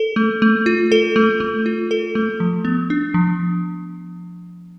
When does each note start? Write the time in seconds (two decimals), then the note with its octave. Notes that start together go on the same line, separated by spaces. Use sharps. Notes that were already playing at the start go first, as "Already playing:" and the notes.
Already playing: A4
0.16 A3
0.42 A3
0.66 F4
0.92 A4
1.16 A3
1.40 A3
1.66 F4
1.91 A4
2.15 A3
2.40 F3
2.65 B3
2.90 D4
3.14 F3